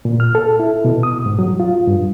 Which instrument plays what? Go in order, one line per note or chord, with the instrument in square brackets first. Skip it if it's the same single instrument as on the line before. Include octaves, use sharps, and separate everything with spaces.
[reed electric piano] A#2
F6
A4
E4
B2
D#6
G#2
F#3
F4
G2